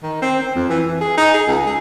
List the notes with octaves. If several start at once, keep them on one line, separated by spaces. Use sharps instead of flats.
D#3
C4
C4
F2
E3
E3
G#4
D#4
G#4
C#2
G#4